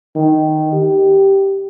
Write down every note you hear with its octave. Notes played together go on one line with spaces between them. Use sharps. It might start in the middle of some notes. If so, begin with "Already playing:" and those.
D#3
G4